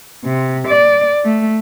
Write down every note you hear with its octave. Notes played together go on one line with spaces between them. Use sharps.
C3
D5
A3